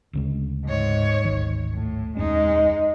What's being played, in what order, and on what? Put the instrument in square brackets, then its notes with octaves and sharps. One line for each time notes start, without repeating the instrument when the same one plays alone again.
[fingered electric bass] D2 C#3 G#3
[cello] G#2 C#5
[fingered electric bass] D1 G#1 D#3
[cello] A2
[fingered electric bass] D#1 F2 C#4 [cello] G#3 D#4